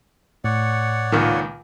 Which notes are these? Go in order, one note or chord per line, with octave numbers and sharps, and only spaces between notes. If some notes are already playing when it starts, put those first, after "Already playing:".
A2 C#5 D5 F#5
C#2 A#2 D#3